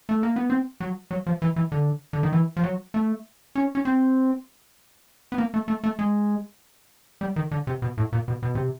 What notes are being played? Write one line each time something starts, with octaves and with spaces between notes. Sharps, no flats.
A3
A#3
B3
C4
F#3
F#3
F3
E3
E3
D3
D3
D#3
E3
F3
F#3
A3
C#4
C#4
C4
B3
A#3
A3
A3
A3
G#3
G3
D#3
D3
C3
B2
A2
A#2
B2
B2
C3